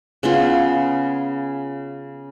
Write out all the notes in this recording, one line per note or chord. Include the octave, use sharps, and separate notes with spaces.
C#3 B3 F4